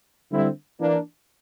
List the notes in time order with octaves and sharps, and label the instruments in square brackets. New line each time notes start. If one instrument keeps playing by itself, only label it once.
[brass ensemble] D3 G3 C4 E4
E3 A#3 D4